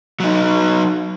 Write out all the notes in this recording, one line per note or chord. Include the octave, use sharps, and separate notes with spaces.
F#3 D#4